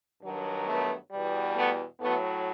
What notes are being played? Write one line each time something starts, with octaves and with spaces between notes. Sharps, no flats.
G2 D#3 F#3
A3 B3
E2 B2 G3
A3 B3
A2 F#3 A3 B3